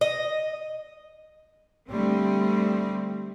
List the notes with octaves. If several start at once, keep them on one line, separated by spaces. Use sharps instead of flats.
D#5
D3 G3 A3 C4